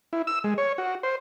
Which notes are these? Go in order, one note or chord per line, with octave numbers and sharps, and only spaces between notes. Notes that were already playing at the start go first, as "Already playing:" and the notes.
E4
E6
G#3
C#5
F#4
C5